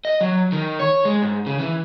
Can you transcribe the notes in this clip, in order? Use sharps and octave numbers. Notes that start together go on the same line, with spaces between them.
D#5
F#3
D#3
C#5
G#3
G#2
C#3
E3